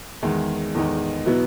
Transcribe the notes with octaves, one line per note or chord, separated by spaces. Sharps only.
E2 D#3 G#3 D#4
E2 D#3 G#3 D#4
B2 F#3 B3 E4